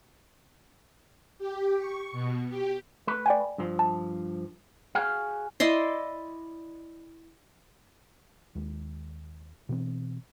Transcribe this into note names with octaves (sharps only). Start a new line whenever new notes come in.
G4
C#6
B2
G4
A3 B4
D5 G5 G#5
G2 F3
A5
F#4 G#4 F5
E4 D5 D#5 C6
D#2 G#3
B2 E3 C4